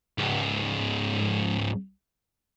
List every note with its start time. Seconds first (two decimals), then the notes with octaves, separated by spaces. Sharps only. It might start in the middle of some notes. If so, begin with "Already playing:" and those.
0.18 C#2 G#2